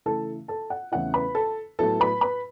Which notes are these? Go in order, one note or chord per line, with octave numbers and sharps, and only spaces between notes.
C#3 E3 A3 E4 A4 A5
A4 A5
F#5
E2 C#3 A3 C#4 E4 F#5
B4 B5
A4 A5
A2 F#3 B3 E4 A4 A5
B4 B5
B4 B5